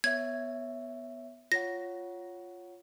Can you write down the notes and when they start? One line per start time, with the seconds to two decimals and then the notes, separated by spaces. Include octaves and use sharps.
0.04 B3 C#5 E5 G#6
1.52 F4 C#5 F#5 A#6